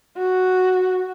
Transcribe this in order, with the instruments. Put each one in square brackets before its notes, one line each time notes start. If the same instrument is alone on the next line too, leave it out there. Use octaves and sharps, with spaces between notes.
[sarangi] F#4